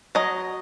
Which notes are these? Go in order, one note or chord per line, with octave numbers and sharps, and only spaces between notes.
F#3 D#5